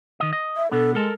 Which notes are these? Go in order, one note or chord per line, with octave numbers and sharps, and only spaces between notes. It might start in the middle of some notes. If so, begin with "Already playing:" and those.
D#3 D#5
D#5
E5
B2 B3 D4 A4
G#3 A4 A#4 A5